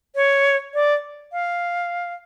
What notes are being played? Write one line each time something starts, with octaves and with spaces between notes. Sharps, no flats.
C#5
D5
F5